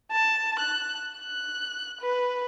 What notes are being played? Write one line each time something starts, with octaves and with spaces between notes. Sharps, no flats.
A5
F#6
F#6
B4